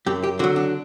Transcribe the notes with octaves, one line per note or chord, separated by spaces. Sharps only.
F#2 G4
G4
D3 F#3 F#4
D4